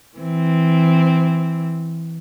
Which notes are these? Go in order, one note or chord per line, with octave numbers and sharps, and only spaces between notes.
E3 C4